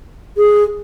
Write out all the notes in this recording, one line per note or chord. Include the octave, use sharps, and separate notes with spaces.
G#4